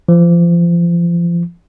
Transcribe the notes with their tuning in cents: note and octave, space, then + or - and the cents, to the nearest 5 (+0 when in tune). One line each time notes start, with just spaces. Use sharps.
F3 -30